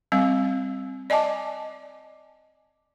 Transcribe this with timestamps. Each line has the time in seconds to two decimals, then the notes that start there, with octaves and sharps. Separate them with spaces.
0.12 G3 C4 F5
1.10 D5 D#5 G#5 A5 D6